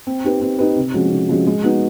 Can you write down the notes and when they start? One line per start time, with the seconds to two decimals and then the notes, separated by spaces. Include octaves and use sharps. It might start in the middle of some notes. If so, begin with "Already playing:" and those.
0.07 C4
0.24 D#4 G4 B4
0.41 C4
0.59 D#4 G4 B4
0.77 C3
0.94 F3 G#3 C#4 F#4
1.12 C3
1.29 F3 G#3 C#4 F#4
1.47 G#3
1.64 B3 D#4 F#4 B4